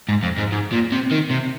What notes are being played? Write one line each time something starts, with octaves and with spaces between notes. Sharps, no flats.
G#2
F2
G#2
G#2
A#2
C3
D#3
C3